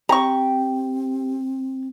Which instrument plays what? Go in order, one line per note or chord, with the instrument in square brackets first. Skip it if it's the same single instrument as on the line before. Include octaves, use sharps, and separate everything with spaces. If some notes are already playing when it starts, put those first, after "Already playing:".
[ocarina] C4 [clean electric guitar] G4 [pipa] A#5 C#6